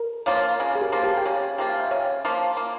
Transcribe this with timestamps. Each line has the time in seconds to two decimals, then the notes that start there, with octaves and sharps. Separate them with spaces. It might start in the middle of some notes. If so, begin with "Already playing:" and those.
Already playing: A#4
0.26 F3 A#3 F4 C#5 F5
0.60 C#3 C#5 F5
0.75 G#4
0.81 G4 A#4
0.92 F3 A#3 F4
1.03 G4 A#4
1.17 G5
1.25 C#3 C#5 F5
1.58 F3 A#3 F4 G5
1.69 F5
1.79 E5 G5
1.91 C#3 C#5 F5
2.25 F3 A#3 F4
2.57 A#3